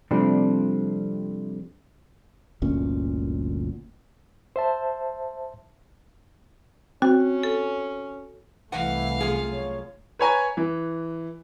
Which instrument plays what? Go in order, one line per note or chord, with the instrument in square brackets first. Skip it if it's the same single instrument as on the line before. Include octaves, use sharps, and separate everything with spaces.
[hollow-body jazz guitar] C3 F3 G3 A3 C4 D4
[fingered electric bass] G1 D2 A#2 C#4
[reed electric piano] C5 E5 A5
[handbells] C4 [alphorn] C#4 [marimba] F#4
[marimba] A4
[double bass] C2 A3 [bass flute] E3 [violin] F5 [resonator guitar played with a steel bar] F#5
[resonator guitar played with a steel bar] F#2 F4 G#4
[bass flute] C#5
[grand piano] B4 C#5 G#5 A#5
E3